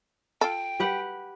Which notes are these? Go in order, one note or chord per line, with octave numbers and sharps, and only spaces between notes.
F4 A4 G5
G4 B4 F#5